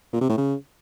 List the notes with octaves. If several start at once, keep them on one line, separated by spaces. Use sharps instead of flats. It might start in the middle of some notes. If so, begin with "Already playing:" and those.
A#2
C3
A2
C#3